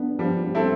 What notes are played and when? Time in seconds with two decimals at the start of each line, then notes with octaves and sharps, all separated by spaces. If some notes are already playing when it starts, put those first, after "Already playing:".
Already playing: B3 D4
0.19 F3 G3
0.43 G3
0.55 C4 E4 A4